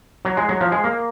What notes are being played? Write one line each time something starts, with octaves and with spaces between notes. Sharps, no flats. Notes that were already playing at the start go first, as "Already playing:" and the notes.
F#3
G#3
F#3
F3
G#3
A#3